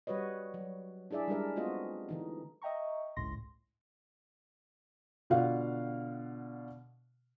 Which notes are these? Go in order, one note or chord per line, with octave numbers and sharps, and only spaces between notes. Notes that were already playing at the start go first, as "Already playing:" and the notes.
G3 F#4 B4 C#5 D#5
F#3
D4 E4 G#4 D5 E5
G3 G#3 D4 A#4 E5
A3 B3 C4 F4 F#4 D#5
D3 E3 D#4
D#5 E5 G5 A#5 C#6
G1 C#2 A2 C6 A#6
B2 D3 F4 F5 F#5